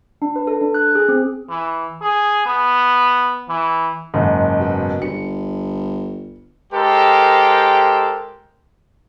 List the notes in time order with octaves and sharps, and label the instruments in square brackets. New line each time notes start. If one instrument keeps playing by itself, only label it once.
[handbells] D4
B4
A4
D4
F#6
G#4
C4
[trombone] E3
G#4
B3
E3
[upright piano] F#1 G#2
[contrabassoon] B2
[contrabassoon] G1 [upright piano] C#7
[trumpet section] G#3 G4 A4 A#4 C5 G5